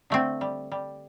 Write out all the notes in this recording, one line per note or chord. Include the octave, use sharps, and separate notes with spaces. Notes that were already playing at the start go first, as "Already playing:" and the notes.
D3 A3 C4
G3
G3